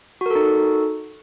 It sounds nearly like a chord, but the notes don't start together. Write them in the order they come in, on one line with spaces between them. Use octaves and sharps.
F#4 A#4 A4 D#4